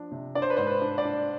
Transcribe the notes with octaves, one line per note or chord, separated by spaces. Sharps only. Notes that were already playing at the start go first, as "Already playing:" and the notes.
Already playing: F3 D4
C3
D4 D5
C5
B4
G#2 C5
B4
D4
D5
D4